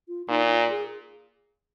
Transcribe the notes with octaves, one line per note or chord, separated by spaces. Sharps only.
F4
A#2 D#4
F4
G#4